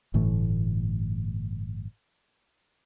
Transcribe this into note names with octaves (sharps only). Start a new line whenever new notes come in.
G1 A2 E3 A3